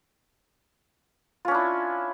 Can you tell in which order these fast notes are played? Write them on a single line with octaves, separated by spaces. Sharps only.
F4 C#4 D4 E4